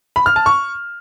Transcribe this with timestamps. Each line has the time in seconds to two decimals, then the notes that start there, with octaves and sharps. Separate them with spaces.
0.16 B5
0.26 F6
0.36 A5
0.46 C#6